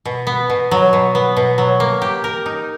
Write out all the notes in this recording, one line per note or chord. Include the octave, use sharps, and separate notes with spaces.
B2
B3
B2
F#3
B2
B3
B2
F#3
A#3
G4
A#4
D#4